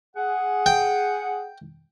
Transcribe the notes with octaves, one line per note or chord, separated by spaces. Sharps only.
G#4 F#5
G5